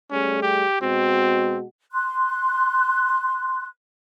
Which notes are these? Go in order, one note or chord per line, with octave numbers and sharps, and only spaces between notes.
G3 A3 C#4 G#4
G4
B2 G#3 C4 F#4
C6 F#6